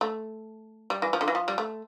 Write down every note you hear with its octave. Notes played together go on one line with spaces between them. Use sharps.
A3
G3
E3
F3
D3
E3
F3
G3
A3